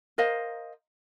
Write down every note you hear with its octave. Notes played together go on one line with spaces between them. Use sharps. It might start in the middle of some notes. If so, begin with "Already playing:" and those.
A#4 C5 D#5 F5